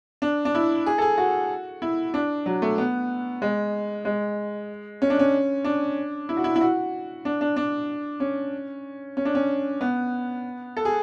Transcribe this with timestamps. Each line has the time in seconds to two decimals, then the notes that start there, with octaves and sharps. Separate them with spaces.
0.22 D4
0.45 D4
0.55 E4
0.86 G#4
0.98 A4
1.02 G#4
1.18 F#4
1.82 E4
2.14 D4
2.46 F#3
2.62 A3
2.78 B3
3.42 G#3
4.05 G#3
5.02 C#4
5.10 D4
5.19 C#4
5.65 D4
6.29 E4
6.37 F#4
6.44 E4
6.56 E4
6.61 F#4
7.25 D4
7.41 D4
7.57 D4
8.20 C#4
9.17 C#4
9.25 D4
9.35 C#4
9.81 B3
10.77 A4
10.85 G#4